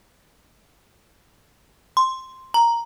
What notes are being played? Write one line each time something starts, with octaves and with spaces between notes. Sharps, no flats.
C6
A#5